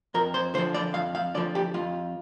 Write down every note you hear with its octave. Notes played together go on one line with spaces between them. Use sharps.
F2 A#4
C5
D3 F3 C5
D5
F2 F5
F5
D3 F3 D5
G4
F2 F4